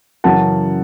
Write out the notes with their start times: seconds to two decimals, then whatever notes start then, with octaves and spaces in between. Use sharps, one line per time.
0.24 F#2 C#3 E3 F#5 A5